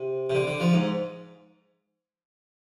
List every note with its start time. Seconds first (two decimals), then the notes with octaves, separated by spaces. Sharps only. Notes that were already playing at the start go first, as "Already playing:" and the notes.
Already playing: C3
0.30 C3
0.35 D3
0.47 D3
0.60 F3
0.73 G#2